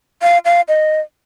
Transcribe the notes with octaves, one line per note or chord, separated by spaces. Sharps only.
F5
F5
D#5